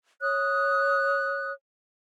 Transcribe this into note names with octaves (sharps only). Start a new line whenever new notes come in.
C#5 D#6 F#6